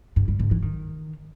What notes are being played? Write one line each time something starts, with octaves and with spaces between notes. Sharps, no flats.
G2
G3
G#2
E3
D#3